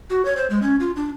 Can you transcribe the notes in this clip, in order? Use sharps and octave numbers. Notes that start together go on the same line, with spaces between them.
F#4
C#5
C5
G#3
C#4
F4
D4